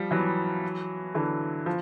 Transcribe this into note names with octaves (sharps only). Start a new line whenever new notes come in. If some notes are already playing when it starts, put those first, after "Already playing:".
Already playing: F3 G3
E3 F#3
D3 E3
F3